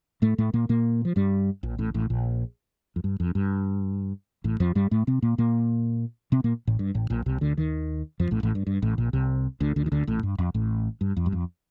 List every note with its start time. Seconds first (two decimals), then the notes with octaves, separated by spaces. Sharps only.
0.22 A2 A3
0.38 A2 A3
0.53 A#2 A#3
0.69 A#2 A#3
1.05 F3
1.16 G2 G3
1.63 A#1 A#2
1.78 A1 A2
1.94 A1 A2
2.10 A#1 A#2
2.96 F2
3.04 G2
3.20 F2
3.35 G2
4.44 A1 A2
4.60 F2 F3
4.75 G2 G3
4.91 A2 A3
5.07 C3 C4
5.22 A#2 A#3
5.38 A#2 A#3
6.32 C3 C4
6.44 A#2 A#3
6.67 A1 A2
6.79 G2
6.94 A1 A2
7.10 A#1 A#2
7.26 C2 C3
7.41 D2 D3
7.58 D#2 D#3
8.20 F2 F3
8.31 A1 A2
8.43 A1 A2
8.55 G2
8.67 G2
8.82 A1 A2
8.98 A#1 A#2
9.13 C2 C3
9.60 D2 D3
9.76 D2 D3
9.86 D#3
9.92 D2 D3
10.07 A1 A2
10.23 G2
10.38 F2
10.54 A1 A2
11.01 G2
11.17 F2
11.26 G2
11.32 F2